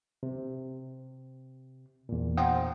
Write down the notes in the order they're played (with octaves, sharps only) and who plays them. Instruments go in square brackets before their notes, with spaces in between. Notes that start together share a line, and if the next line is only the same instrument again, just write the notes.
[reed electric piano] C3
E2 A#2
[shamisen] F3 F#3 G5